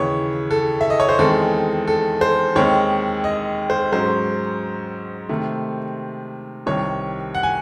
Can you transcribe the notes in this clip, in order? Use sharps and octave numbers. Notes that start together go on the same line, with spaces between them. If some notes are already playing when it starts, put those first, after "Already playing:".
Already playing: D#2 C#3 E3 C#5
A4
E5
D#5
C#5
C5
E2 D#3 G#3 C4 A4
A4
C5
D#2 D#3 G#3 C4 C#5
D#5
C5
G#2 F#3 C#4 C5
C3 D#3 A3
C2 C3 D#3 C#5
F#5
G#5